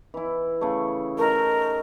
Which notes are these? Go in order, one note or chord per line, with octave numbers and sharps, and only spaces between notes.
E3 E4
C#3 A3
A3 D#4 A#4